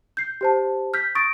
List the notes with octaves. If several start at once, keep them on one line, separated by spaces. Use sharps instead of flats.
G6 C7
G4 C5 A5
F6 G6 B6
C#6 D#6 A6 A#6 D7